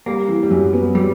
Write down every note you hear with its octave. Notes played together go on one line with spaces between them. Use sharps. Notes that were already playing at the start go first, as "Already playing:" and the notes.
G3 A#3
E3
G3
F#2 F#3
B3
F#3 G3